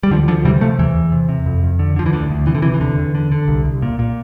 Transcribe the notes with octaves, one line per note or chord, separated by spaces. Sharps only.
G3
D2 D3 F3
D2 D3 F3
C3 E3 G3
C3 F3 A3
E2 E3
E2
C3
C3
F2
F2
D3
D3 F3
E3
D2 D3
D2
C3 E3
D3
C3 E3
E3
E2 D3
E2
D3
D3
C2
C2
A#2
A#2